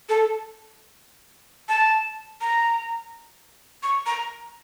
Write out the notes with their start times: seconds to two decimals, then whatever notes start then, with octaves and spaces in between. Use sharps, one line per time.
0.09 A4
1.69 A5
2.41 A#5
3.83 C#6
4.06 A#5